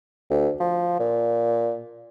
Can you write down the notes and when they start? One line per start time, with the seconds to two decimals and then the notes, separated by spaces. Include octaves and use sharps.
0.30 D2
0.60 F3
0.99 A#2